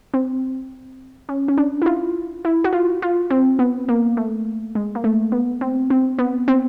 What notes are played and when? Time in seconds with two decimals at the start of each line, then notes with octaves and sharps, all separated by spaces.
0.14 C4
1.29 C#4
1.48 C#4
1.57 D4
1.82 E4
1.86 F4
2.45 E4
2.64 F#4
2.73 F4
3.02 F4
3.30 C4
3.59 B3
3.89 A#3
4.17 A3
4.75 G#3
4.95 A#3
5.04 A3
5.32 B3
5.61 C4
5.90 C4
6.19 B3
6.48 C4